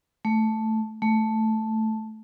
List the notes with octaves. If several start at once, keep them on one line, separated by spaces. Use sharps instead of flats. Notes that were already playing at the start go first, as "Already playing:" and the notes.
A3
A3